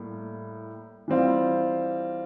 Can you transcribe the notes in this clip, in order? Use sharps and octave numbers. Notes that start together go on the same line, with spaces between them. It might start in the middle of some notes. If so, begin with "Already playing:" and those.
Already playing: A2 G3 A#3
E3 G3 C4 F4